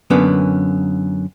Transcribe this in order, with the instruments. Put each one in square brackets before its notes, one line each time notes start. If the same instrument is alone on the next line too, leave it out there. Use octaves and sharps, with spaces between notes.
[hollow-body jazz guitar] F#2 D3 A#3 B3 C#4